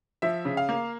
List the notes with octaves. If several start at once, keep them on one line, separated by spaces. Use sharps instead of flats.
F3 E5
C#3
F5
A#3